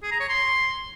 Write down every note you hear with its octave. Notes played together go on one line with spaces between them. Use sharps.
G#4
A#5
C#5
C6